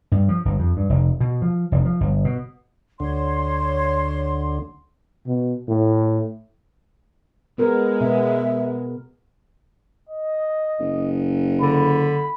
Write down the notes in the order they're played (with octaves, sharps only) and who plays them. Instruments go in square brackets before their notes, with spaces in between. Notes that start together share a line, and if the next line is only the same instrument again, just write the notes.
[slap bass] G2
F3
G1
F2
G2
F1
B2
F3
F1
F3
G1
B2
[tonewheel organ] D2 D3 [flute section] C#5 C6
[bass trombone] B2
A2
[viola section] G#3 [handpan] B3 A#4
[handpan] B2 B3 [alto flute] E5
[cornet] D#5
[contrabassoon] F#1
[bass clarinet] D3 [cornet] B5